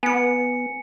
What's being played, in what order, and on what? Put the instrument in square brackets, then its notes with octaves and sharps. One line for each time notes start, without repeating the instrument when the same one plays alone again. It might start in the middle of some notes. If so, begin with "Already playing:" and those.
[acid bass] B3 [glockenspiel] G#5 C#7